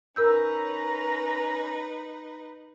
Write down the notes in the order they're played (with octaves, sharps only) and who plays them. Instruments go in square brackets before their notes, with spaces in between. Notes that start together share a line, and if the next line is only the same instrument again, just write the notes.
[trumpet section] C#4 A#5 [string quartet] D#4 B4 [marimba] A#4 E6 G6